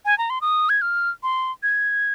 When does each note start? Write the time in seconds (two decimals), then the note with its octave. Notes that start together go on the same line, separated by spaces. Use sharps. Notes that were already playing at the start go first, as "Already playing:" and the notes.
0.05 G#5
0.18 A#5
0.30 C6
0.41 D#6
0.69 G#6
0.82 F6
1.23 C6
1.63 G#6